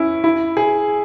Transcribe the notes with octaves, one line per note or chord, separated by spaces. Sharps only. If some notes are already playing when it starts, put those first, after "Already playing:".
Already playing: C#4 E4
E4
G#4